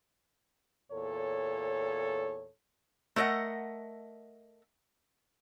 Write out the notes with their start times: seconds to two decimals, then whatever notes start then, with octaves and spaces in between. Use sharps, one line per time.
0.91 E2 A#2 A4 C#5
3.16 A3 A#4 C5 D#5 F#5